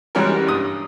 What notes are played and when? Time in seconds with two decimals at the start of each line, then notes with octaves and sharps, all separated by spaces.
0.15 E3 G3 G#3 C#4 F#4 A#4
0.47 G2 D#6